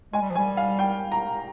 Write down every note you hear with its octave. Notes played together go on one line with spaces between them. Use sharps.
G#3 G#5
G3
F3
G#5
G3
F5
G5
A#5